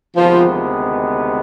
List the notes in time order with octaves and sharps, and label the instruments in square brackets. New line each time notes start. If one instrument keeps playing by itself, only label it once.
[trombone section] D2 C3 D#3 G#3 B3 [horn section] F3